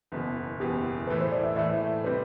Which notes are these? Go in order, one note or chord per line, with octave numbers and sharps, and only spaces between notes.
F#1 E2 B2
F#1 E2 B2 G4
A2 E3 A3 B4
C5
D5
E5
A2 E3 A3 E5
C3 G3 C4 B4